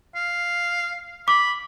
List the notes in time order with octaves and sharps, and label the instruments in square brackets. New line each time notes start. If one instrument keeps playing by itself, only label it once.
[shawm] F5
[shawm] B5 [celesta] D6